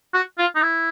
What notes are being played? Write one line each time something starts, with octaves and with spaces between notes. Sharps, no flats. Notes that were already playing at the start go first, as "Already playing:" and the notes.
F#4
F4
D#4
E4